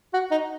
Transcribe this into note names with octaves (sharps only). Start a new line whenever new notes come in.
F#4
D#4